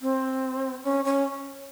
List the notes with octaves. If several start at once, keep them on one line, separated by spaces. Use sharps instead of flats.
C4
C#4
C#4